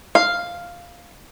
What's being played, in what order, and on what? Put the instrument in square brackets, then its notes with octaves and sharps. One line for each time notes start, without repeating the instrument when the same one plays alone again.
[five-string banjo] F5